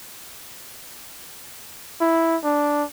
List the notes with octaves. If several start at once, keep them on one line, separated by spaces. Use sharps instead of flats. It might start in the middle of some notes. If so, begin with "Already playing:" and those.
E4
D4